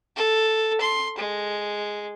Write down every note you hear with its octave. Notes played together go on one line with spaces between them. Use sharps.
A4
C6
G#3